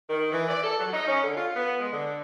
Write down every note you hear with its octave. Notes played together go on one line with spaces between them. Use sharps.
D#3
E3
D5
A4
F#3
D#4
C#4
D3
F4
B3
G#3
D3